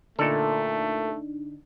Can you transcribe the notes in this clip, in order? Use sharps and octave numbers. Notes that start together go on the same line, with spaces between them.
A#2 D3 A3 D4 D#4 A4